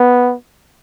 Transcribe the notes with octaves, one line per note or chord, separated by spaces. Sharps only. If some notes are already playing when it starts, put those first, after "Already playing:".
Already playing: B3